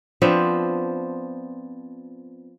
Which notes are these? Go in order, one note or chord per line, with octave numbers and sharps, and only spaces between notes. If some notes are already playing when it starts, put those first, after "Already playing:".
F3 B3 C4 D4